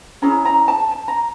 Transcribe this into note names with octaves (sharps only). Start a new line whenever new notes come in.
C#4 E4 G#4 A#5
A#5
A5
A5
A#5